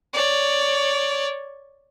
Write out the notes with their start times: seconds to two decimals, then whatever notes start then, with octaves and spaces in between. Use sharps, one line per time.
0.13 C#5 D5